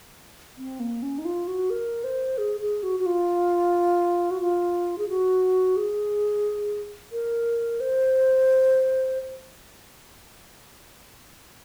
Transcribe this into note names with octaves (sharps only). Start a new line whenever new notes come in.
C4
A#3
C#4
D#4
F4
F#4
A#4
C5
G#4
G#4
F#4
F#4
F4
F#4
F4
G#4
F#4
G#4
A#4
C5